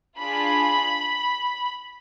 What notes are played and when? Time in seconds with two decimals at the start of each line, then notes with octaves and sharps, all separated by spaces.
0.19 D4 F4 G#4 B5